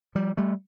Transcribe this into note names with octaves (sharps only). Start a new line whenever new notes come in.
F3 G3
G3 A3